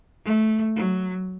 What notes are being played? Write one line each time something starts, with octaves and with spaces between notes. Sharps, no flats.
A3
F#3